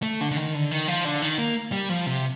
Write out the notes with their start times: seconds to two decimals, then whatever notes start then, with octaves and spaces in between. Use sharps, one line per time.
0.03 A3
0.21 D3
0.31 D3
0.36 D#3
0.55 D3
0.71 D#3
0.88 F3
1.05 D3
1.22 D#3
1.38 A#3
1.72 G3
1.89 F3
2.06 C3